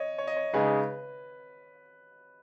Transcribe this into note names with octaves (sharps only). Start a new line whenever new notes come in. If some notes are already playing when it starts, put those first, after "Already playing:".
Already playing: C#5 D#5
C#5
D#5
C#5
C#3 G#3 D#4 G#4 B4